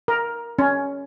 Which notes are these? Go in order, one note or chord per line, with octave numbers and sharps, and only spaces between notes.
A#4
C#4